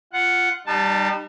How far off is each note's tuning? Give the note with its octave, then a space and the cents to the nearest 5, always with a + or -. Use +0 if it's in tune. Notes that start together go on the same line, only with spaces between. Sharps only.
F4 -5 F#5 +0
G3 +0 D#4 -40 A5 -5